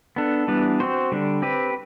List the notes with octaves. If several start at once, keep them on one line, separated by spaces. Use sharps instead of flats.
B3 D4 A4
E3 G3 B3 D4
C4 F#4 C5
D3 G3 D4
C4 G4 B4